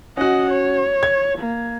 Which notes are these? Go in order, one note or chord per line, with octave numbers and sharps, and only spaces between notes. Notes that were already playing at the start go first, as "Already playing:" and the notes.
C#4 F#4 D#5 F#5
C#5
G#6
A#3